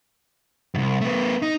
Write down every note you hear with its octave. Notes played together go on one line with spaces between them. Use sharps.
C2 F#2
A3 B3
D#4